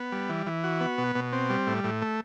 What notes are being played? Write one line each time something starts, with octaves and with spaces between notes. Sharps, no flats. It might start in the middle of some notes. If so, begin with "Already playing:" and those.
Already playing: B3
G3
E3
E3
F#4
B3
B2
B2
C4
G3
A2
A2
A3